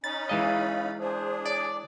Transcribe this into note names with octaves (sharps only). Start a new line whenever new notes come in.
C#4 D#4 B5 A6
E3 G#3 D#5 F5
D4 G#4 C5
C#5 D5